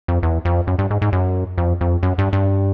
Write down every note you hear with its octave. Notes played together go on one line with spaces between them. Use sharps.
F2
E2
F2
F#2
G2
G#2
G#2
F#2
F2
F2
F#2
G2
G2